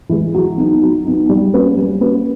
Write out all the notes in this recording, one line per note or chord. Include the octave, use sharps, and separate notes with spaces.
E3 G#3
F#3
B3 D#4
F#3
B3 D#4
G3
A#3 C#4 F#4 B4
G3
A#3 C#4 F#4 B4